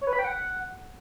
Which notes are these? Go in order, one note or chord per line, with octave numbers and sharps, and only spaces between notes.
C#5
B4
B5
G5
F#5